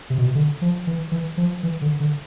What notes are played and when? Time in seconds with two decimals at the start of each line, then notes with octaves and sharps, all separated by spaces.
0.10 C3
0.18 B2
0.27 C3
0.35 D3
0.62 F3
0.87 E3
1.12 E3
1.37 F3
1.63 E3
1.82 D3
2.00 D3